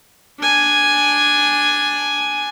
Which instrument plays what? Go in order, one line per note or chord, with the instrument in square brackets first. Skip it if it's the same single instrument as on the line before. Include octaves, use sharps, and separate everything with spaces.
[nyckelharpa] D4 G#5